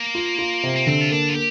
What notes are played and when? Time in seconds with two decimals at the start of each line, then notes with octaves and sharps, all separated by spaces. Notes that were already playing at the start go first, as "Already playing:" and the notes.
Already playing: A#3
0.15 F4
0.39 F4
0.63 C3
0.76 A#3
0.87 D3 C4
1.01 F4
1.11 A#3 D4
1.29 F4
1.35 A#3 G4